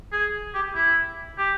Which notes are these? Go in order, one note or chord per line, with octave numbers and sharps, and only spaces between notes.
G#4
G4
E4
G4